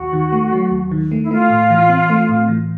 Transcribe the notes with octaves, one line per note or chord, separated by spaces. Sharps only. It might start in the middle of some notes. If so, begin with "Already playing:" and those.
Already playing: D#2 F#4
D#3
A3
F#3
D#2
D#3
A3
E4
A3 F4
A2
E3
C4
A3
A2
E3